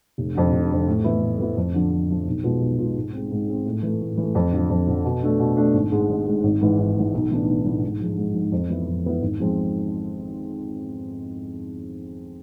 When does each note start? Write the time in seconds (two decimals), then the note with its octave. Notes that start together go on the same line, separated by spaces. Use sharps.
0.18 F1
0.35 F2 D3
0.52 F1
0.70 F2 D3
0.87 A2
1.04 E3 B3 E4
1.23 A2
1.39 E3 B3 E4
1.57 F2
1.74 D3 F3
1.91 F2
2.09 D3 F3
2.27 B1
2.43 B2 G#3 B3 F4
2.61 B1
2.78 B2 G#3 B3 F4
2.95 G#2
3.13 G#3 C4
3.31 G#2
3.47 G#3 C4
3.65 A2
3.83 E3 A3
4.01 A2
4.17 E3 A3
4.35 F2
4.52 D3 F3
4.70 F2
4.87 D3 F3
5.05 B2
5.22 A3 D4
5.40 B2
5.57 A3 D4
5.73 G#1
5.92 G#2 G#3
6.09 G#1
6.27 G#2 G#3
6.43 G#1
6.61 G#2 E3
6.78 G#1
6.96 G#2 E3
7.14 B1
7.30 A2 E3 B3 D4
7.48 B1
7.65 A2 E3 B3 D4
7.83 G#2
8.00 F3 G#3
8.17 G#2
8.35 F3 G#3
8.52 F2
8.70 E3 B3 E4
8.88 F2
9.05 E3 B3 E4
9.21 G#1
9.39 G#2 F3 G#3 C4